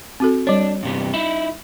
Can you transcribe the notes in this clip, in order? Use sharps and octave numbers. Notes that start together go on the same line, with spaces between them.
C4 F#4 A4
G3 D4 C#5
G2 C3 B3
D#4 E4 E5